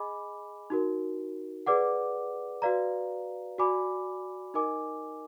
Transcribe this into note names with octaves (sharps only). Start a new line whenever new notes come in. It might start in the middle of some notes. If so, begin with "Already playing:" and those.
Already playing: G#4 D#5 G#5 B5 D6
D#4 F#4 A#4
G#4 B4 D5 F#5 D6
F#4 B4 D5 F5 A#5
F#4 D5 G#5 B5 D6
D#4 A#4 D#5 G#5 D6